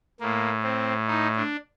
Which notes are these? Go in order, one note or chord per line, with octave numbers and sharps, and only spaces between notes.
A2 A#3
C4
D#4
D4